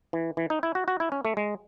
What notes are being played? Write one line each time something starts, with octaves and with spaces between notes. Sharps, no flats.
E3
E3
D#4
E4
F#4
F#4
E4
C#4
A3
G#3